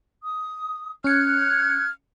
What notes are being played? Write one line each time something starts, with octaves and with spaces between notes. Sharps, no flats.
D#6
C#4 F6 F#6 G#6 C#7